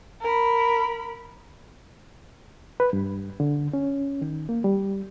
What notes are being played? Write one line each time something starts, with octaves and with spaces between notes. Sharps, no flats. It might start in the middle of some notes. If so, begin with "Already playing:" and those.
A#4 B5
B4
G2
D3
C#4
D#3
A#3
G3